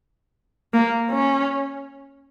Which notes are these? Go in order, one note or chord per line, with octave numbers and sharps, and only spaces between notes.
A#3
C#4